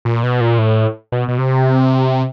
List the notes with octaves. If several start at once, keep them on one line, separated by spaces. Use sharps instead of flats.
A#2
B2
A#2
A2
B2
B2
C3